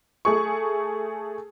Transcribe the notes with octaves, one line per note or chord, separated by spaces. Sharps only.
A3 G#4 C#6